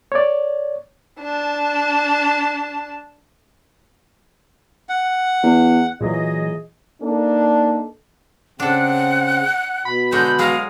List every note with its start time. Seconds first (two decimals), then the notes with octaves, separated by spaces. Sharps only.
0.12 C#5 D5
1.20 D4 A5
4.89 F#5
5.43 E2
6.01 A#2 E3 F#3 G#4 D#5
7.02 A#3 D4 D#4 A4
8.60 C#3 C4 D4 A4 F#5
9.85 B2 B5
10.12 D3 G#3 C#5 G6
10.39 F#3 G#3 G#4 F5